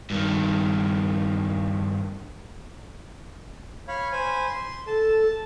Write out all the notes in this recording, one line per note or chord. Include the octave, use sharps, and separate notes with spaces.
G2 D#3
C#5 F5 B5
C5 G#5 B5
C6
A4 A5